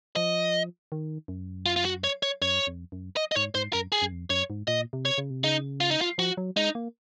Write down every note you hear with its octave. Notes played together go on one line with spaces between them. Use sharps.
F3 D#5
D#3
F#2
F4
F4
F#4
C#5
C#5
F#2 C#5
F2
F#2
D#5
D#5
G#2 C#5
G#2 C5
F#2 A#4
G#4
F#2
F2
F#2 C#5
G#2
A#2 D#5
C3
C#5
C#3
C3
C#3 D#4
F4
D#4
F4
F3 F#4
F#3
G#3 D#4
A#3